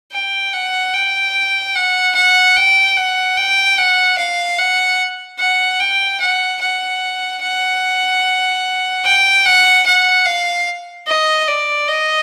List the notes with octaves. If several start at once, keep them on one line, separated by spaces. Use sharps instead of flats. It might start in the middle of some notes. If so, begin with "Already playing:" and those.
G5
F#5
G5
F#5
F#5
G5
F#5
G5
F#5
F5
F#5
F#5
G5
F#5
F#5
F#5
G5
F#5
F#5
F5
D#5
D5
D#5